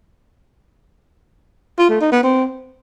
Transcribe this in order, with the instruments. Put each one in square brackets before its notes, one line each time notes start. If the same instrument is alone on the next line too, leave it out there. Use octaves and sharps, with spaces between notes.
[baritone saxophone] F4
A3
D#4
B3
C4